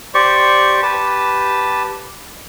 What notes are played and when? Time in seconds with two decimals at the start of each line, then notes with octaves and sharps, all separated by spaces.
0.14 G4 C5 D5 C#6
0.82 G4 B4 A5